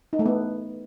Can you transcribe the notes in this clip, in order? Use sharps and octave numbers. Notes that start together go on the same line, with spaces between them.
D#4
A3
B3